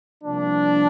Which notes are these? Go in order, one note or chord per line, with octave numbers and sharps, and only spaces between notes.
C2 C3 F3 A#3 D4